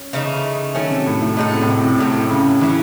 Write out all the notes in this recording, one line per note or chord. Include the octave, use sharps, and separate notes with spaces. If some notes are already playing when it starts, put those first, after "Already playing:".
Already playing: C#4
C#3 E3 A3 D#4
D#3 F#3 A3 C#4
C3
A2
A2
A2 G#3 D#4 F#4 A4
C3
A2
C3
C3
A2 C3 D#3 F#3 C#4
C#3
E3 F#3 C#4 E4 G#4